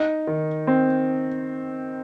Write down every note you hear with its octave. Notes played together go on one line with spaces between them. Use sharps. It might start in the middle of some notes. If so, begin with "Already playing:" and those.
Already playing: D#4
D#3
C4